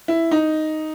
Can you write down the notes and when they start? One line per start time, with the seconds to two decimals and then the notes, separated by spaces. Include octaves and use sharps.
0.08 E4
0.31 D#4